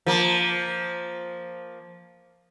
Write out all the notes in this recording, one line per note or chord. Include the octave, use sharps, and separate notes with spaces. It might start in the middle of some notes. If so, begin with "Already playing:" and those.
F3 A#3